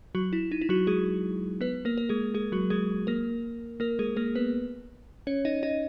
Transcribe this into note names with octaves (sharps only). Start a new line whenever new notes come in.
F#3 F#4
E4
D#4
E4
F#3 F#4
G#3 G#4
B3 B4
A#3 A#4
A#4
G#3 G#4
G#3 G#4
F#3 F#4
G#3 G#4
A#3 A#4
A#3 A#4
G#3 G#4
A#3 A#4
B3 B4
C#4 C#5
D#4 D#5
D#4 D#5